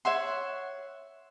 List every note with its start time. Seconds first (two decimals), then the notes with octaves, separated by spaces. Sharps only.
0.05 C#5 E5 F#5 C6